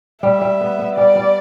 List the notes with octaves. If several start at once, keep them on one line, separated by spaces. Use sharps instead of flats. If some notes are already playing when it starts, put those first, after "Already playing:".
G3 E5
G3
B3
B3
G3 D5
G3